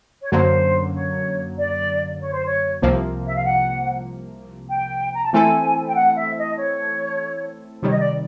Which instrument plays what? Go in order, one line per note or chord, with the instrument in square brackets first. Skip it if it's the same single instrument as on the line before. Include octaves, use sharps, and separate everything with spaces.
[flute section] C#5
[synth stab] F#2 D3 F#3 A#3 [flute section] C5
[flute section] C#5
D5
C#5
C5
C#5
[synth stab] C2 C3 F3 A#3
[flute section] E5
F5
F#5
G5
A#5
A5
[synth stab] E3 A3 C4 E4 A4 [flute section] G#5
[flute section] G5
F#5
E5
D#5
C#5
[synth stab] C3 D#3 G3 [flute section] C#5
[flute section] D#5
D5